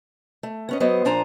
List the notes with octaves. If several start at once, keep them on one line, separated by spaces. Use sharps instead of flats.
A3
B3 C#4 D#5
F#3 B3 C5 D#5
A#2 F3 D4 C5 G#5 A#5